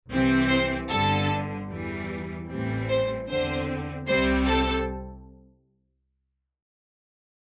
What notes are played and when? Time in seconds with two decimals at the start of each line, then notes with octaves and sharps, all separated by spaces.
0.10 C2 C3 E3 C4
0.49 C5
0.89 G1 G2 D3 A4
1.68 E2 E3 G3
2.48 A1 A2 E3 G3 C4
2.89 C5
3.28 E2 D3 C4 C5
4.07 C2 C3 G3 C4 C5
4.47 A4